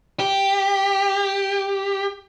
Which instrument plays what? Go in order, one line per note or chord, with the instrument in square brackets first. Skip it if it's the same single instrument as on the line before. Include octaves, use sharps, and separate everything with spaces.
[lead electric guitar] G4